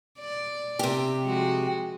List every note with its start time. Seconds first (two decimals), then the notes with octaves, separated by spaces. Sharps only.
0.19 D5
0.79 C3 G4
1.22 F3 G#3 F#4